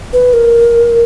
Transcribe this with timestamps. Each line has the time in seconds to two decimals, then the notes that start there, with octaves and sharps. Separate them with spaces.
0.13 B4
0.33 A#4